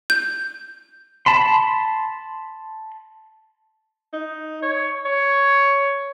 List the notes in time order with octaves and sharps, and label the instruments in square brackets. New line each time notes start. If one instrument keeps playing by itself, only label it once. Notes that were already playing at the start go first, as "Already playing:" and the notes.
[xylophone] G6
[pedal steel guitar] A5 B5 C6
[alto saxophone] D#4
C#5
C#5